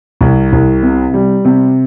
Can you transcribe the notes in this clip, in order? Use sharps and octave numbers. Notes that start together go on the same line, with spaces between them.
C2
C2
C3
G3
C3